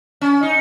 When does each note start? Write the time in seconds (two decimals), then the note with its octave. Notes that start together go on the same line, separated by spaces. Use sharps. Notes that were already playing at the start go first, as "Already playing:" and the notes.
0.21 C#4
0.43 D#4